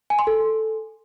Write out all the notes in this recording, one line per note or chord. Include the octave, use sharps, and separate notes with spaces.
G#5
C6
A4